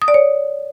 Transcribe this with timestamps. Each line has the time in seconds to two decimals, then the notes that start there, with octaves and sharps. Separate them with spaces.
0.02 D#6
0.08 D5
0.14 C#5